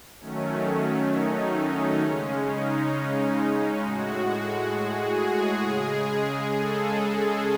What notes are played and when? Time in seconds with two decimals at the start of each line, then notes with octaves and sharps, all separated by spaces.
0.20 D#3 F#3 A3 C#4
1.11 D#4
1.56 C#4
2.02 C#3 G#3
2.46 D#4
3.82 A2 G#3 F#4
4.72 G#4
5.18 G#4
5.62 C#3 G#3
6.54 A4